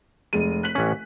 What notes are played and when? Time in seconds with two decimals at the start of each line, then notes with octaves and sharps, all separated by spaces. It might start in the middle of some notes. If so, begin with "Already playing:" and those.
0.33 F1 G#3 D#7
0.63 F#6 B6 F#7
0.75 A1 C#4